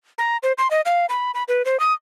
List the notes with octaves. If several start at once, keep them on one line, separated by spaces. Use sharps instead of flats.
A#5
C5
C6
D#5
F5
B5
B5
B4
C5
D#6